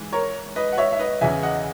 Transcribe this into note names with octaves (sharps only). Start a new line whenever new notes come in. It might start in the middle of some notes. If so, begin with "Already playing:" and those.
Already playing: G#2 E3
A#4 C#5
B4 D#5
F#5
C#5 E5
E5
B4 D#5
E2 C#3 E3 E5 G#5
D#5 F#5